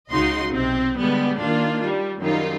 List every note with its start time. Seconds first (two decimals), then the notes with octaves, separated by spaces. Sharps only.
0.11 C#2 C#3 D#4 F#4 D#5 C6
0.52 B1 C3 C4
0.97 D3 G3 G#3 B3
1.40 D#3 A#3 D4 F4
1.85 G3
2.21 F#2 D#3 G3 D#4 F4